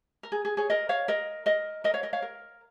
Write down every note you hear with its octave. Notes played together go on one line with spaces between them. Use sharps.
A#4
G#4
G#4
G#4 C#5
A#4 D#5
C#5 F5
A#4 D#5
A#4 D#5
A#4 D#5
C#5 F5
A#4 D#5
C#5 F5
A#4